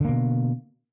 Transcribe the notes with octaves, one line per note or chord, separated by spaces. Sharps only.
B2 D3 A#3